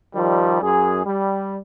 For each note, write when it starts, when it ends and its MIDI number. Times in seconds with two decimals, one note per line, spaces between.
0.15 0.61 51
0.15 0.61 53
0.15 0.61 55
0.62 1.05 42
0.62 1.05 68
1.06 1.58 55